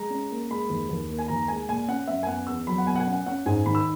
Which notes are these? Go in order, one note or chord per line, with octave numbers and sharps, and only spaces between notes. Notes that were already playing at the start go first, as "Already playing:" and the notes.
Already playing: G#3 A#5
C#4
A#3
G#3 B5
D#2
D#2
A#3
G#5
D#2 A#5
G#3 G#5
A#2 G#5
C#4 F#5
F#2 E5
G#5
B3 F#5
E2 E6
F#3 B5
F#5
B2 G#5
F#5
G#5
C#4
F#5
C#4 F#5
G#2 G#5
D#3 B5
E6